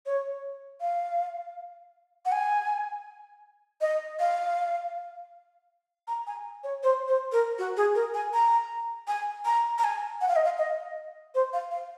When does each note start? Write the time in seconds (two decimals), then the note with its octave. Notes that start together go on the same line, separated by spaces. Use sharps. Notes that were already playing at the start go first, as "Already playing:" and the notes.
0.06 C#5
0.81 F5
2.26 F#5
2.32 G#5
3.81 D#5
4.20 F5
6.08 A#5
6.27 G#5
6.64 C#5
6.83 C5
7.08 C5
7.32 A#4
7.58 F#4
7.77 G#4
7.95 A#4
8.14 G#5
8.33 A#5
9.08 G#5
9.45 A#5
9.78 A#5
9.84 G#5
10.21 F#5
10.28 F5
10.36 D#5
10.44 F5
10.58 D#5
11.35 C5
11.53 F5
11.71 F5